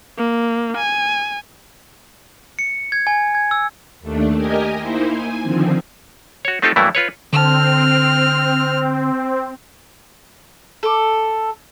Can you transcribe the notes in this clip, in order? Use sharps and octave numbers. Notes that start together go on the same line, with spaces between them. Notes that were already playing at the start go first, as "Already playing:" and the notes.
A#3
G#5
C#7
G#6
G#5
G#6
E6
D#2 A3 D4
G4 A#4 D#5 G#5
A#3 D#4 E4 C5
G#5
D3 D#3 F3 C4
F#4 C#5
A3 C4 D#4 F4 G4 A4
G2 E3 F#3 A3 A#3 E4
F4 B4 C#5
D3 C4 A5 F6
A4 D6